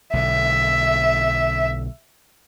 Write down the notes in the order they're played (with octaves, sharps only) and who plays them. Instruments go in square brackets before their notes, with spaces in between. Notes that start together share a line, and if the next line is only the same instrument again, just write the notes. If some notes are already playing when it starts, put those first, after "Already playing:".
[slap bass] B1 D3 [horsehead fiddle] E5